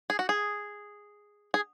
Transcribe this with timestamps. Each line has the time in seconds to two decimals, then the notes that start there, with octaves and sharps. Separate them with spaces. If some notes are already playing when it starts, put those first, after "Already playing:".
0.10 G#4
0.19 F#4
0.29 G#4
1.54 G#4